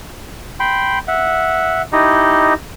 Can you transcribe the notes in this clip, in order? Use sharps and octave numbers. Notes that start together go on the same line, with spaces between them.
G5 B5 C6
E5 F#5
D#4 E4 G4 D#5